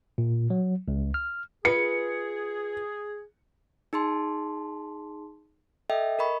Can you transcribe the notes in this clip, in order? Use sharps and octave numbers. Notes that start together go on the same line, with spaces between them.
A#2
F#3
C#2
F6
F4 G#4 B4 C#7
D#4 G#4 A5 C6
A4 D#5 E5 G5
A#4 D#5 B5 C#6